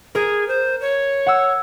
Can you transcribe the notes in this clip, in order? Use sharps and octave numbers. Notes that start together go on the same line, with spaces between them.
G#4 A#4
C5
C#5
F#5 E6